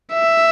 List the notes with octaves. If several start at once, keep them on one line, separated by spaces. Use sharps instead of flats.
E5